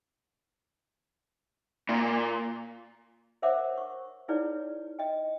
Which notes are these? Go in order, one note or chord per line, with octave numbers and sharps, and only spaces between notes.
A#2
A#4 C5 C#5 E5 F#5 D6
C#6
D#4 E4 G#4 B4 C#5 D5
D#5 G5